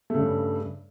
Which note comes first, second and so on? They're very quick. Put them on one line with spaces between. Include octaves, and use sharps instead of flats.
A3 C#3 G2